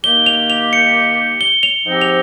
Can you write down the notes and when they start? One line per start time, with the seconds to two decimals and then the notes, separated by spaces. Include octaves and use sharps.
0.04 D#3 A#3 D#4 G4 G7
0.26 F7
0.50 F7
0.73 C#7
1.41 G7
1.63 F7
1.85 G#2 F3 C4 D#4 G4
2.01 F7